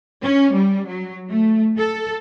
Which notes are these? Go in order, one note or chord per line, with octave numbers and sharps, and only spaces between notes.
C#4
G3
F#3
A3
A4